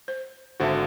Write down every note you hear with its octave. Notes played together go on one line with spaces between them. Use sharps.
C5
G#1 D3 F#4 C5 E5 A5